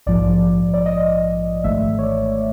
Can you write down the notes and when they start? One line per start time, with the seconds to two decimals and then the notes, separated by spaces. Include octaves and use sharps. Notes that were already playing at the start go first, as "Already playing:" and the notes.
0.06 A#1 G#2 F3 D5
0.74 D5
0.86 D#5
1.64 G#1 G#2 E3 A3 E5
1.98 C#5
2.03 D5